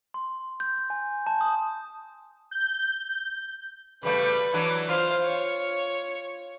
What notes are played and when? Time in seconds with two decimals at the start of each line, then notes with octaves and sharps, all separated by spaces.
0.14 C6
0.60 G6
0.90 G#5
1.27 A5
1.41 D#6
2.51 G6
4.03 C#3 G3 A3 B4
4.53 E3 F#3 D4
4.89 F4 C5 F5
5.25 C#5